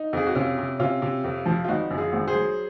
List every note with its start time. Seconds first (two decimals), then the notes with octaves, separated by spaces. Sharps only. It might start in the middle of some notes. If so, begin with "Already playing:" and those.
Already playing: D#4
0.13 F2 G#4
0.26 F#4
0.35 C3 C#4 F4
0.58 C3
0.79 C3 C#4 F4
1.02 C3
1.24 F2
1.46 F3
1.64 F4
1.68 G#1 D#4 F#4
1.90 F#2
1.98 F4 G#4
2.13 G#1
2.28 G#4 C5
2.35 F#3